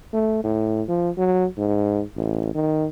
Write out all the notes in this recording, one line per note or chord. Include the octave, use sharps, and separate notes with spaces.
A3
A2
F3
F#3
G#2
A1
D#3